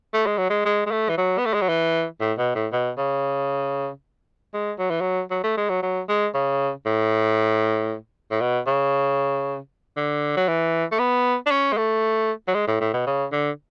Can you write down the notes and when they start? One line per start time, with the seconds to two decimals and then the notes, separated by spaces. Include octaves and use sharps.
0.14 A3
0.26 G#3
0.38 F#3
0.50 G#3
0.65 G#3
0.86 G#3
0.91 A3
1.09 E3
1.17 F#3
1.38 B3
1.46 A3
1.54 G#3
1.61 F#3
1.69 E3
2.20 A2
2.38 B2
2.55 A2
2.72 B2
2.98 C#3
4.54 G#3
4.79 F#3
4.90 E3
5.01 F#3
5.30 F#3
5.43 A3
5.57 G#3
5.69 F#3
5.83 F#3
6.09 G#3
6.34 C#3
6.86 A2
8.31 A2
8.41 B2
8.67 C#3
9.96 D3
10.37 F#3
10.48 E3
10.92 A3
10.99 B3
11.46 D4
11.51 C#4
11.72 G#3
11.77 A3
12.48 F#3
12.54 G#3
12.67 A2
12.80 A2
12.94 B2
13.06 C#3
13.32 D3